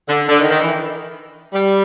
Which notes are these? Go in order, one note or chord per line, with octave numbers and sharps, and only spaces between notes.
D3
D3
D#3
D#3
E3
G3